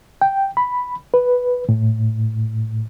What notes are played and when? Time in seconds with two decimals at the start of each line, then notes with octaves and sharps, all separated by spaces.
0.22 G5
0.57 B5
1.14 B4
1.69 A2